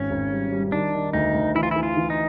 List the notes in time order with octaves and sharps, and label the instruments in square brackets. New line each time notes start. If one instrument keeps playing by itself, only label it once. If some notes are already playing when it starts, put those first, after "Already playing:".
Already playing: [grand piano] G#1 [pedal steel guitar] C#4
[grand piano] G#1
G3
G3
[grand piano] D#3 [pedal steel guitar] D4
[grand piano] D#3
[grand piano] D2 [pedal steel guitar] D#4
[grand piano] D2
[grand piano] E3 [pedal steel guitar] E4
[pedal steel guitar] F4
[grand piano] E3 [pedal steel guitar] E4
[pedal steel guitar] F4
[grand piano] E3
[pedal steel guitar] D#4